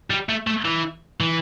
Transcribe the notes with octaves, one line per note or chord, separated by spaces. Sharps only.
G3
A3
A3
E3
E3